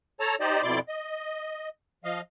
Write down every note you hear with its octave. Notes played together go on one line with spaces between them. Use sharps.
A4 C#5 A5 A#5
D#4 G4 C5 D5 D#5
F2 B2 E4 D5 C6 D6
D#5
F3 D#5 F5